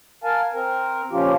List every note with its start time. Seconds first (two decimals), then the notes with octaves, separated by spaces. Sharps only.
0.24 A#4 F5 G#5 A5
0.53 C4 A#4
1.11 A#2 C#3 F3 C#4 F4 G4